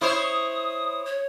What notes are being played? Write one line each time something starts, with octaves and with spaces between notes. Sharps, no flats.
E4 C5 C#5 D#6
C#5